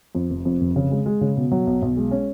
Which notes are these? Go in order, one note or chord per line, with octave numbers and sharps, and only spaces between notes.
F2
F1
F2
F1
C#3
G#3
G#3
C#3
B2
F#3
B1
B1
G#3
C#4